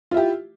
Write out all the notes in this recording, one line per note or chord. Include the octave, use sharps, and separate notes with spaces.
E4 F4 G4